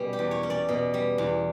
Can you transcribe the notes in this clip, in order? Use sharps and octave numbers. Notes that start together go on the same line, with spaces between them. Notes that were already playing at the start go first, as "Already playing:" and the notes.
Already playing: B2 G3 C#4
G4
E2
C#5
C#4
D5
B2
G3
E2